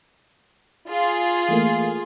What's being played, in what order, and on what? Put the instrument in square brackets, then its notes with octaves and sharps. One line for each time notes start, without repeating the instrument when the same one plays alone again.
[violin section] F4 G#4
[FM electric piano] E3 A3 A#3